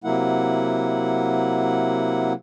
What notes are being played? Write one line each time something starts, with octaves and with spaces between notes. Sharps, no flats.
C3 F#3 A#3 E4 F#5